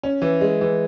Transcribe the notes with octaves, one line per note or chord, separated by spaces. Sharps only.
C#4
E3
G#3
E3